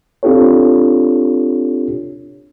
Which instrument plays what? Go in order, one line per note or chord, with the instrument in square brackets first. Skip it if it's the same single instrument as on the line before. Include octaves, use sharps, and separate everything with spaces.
[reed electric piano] C4 D4 F4 G4 A4 C#5